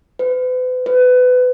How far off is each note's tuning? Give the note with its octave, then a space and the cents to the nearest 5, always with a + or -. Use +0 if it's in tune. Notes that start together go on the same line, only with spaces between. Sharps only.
B4 +40
B4 +25